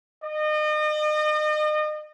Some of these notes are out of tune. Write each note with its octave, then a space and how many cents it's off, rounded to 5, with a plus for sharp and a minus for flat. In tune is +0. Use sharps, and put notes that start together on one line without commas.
D#5 -35